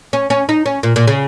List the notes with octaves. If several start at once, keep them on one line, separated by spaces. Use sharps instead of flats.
C#4
C#4
D#4
C#4
A#2
A#2
C#3